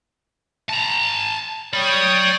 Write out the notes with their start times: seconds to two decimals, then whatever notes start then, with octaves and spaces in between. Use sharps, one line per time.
0.69 A5 A#5
1.74 C#5 D5 G5 B5 D#6